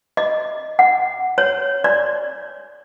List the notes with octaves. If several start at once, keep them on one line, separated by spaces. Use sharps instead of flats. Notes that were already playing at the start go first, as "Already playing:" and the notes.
D#5
F#5
C#5
D5